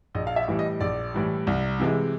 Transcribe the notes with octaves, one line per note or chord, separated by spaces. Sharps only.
A#1 D#5
F5
E5
A2 E3 G3
D#5
A#1 D5
A2 E3 G3
C2
C3 E3 G#3